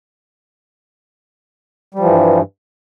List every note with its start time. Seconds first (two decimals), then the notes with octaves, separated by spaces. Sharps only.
1.94 G3
1.99 F3
2.04 E3
2.08 G2